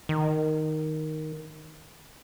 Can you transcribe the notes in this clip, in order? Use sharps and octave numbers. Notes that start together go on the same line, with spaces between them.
D#3